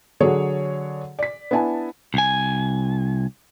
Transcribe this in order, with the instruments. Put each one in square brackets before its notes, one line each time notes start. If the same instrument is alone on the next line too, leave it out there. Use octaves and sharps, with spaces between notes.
[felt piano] D3 F#3 D4 G#4 C#5
D5 B6
B3 D4 E4 G#5 A5
[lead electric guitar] C2 G#5